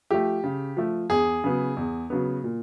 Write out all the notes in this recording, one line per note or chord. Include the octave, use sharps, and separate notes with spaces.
F3 A3 G4
C#3
F3 A3
E2 G#4
C#3 F#3 B3
E2
C#3 F#3 B3
A#2